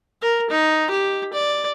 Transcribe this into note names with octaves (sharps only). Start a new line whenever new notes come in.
A#4
D#4
G4
D5